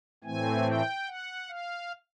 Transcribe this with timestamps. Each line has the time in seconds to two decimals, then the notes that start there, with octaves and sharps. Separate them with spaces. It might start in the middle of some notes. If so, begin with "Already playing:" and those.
0.24 A2 E3 A3 C4 G#5
0.65 G5
1.07 F#5
1.49 F5